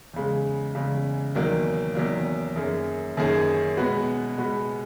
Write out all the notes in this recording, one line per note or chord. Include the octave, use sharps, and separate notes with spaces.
E2 C#3 G#3
E2 C#3 G#3
E2 D#3 F#3 A#3
E2 D#3 F#3 A#3
F#2 D#3 A#3 C#4 G#4
F#2 D#3 A#3 C#4 G#4
B2 G#3 B3 F#4 B4
B2 G#3 B3 F#4 B4